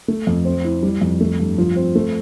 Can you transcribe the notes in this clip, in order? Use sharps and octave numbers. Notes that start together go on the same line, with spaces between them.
A3
F2
C4
E4
G3
F2
A3
G2
F3
C4
A3